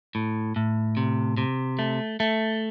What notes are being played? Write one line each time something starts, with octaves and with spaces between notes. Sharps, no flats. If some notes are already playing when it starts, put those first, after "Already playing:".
A2
A2
C3
C3
A3
A3